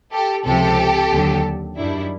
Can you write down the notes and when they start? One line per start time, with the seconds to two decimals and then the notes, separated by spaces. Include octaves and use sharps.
0.12 G4 A4
0.45 C#2 C3 F3 G4 A4
1.11 D#2 D3 F#3
1.77 F#2 D#3 G3 D4 E4